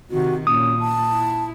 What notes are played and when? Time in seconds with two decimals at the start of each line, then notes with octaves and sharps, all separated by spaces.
0.11 C3 D#3 F#4
0.47 A#2 C#4 D#6
0.80 A5
1.11 E4